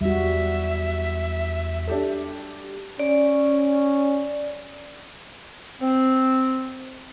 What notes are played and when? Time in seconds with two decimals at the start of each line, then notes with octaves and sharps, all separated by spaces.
0.01 E2 G3 F#4 E5
1.87 D4 G4 A4
2.99 C#4 D5
5.81 C4